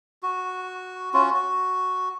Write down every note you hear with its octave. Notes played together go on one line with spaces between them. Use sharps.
F#4
C#4 F4 F#4
F#4